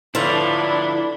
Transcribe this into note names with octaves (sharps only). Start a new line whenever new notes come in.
D3 F3 D4 E4 B4 C#5 A#5 B5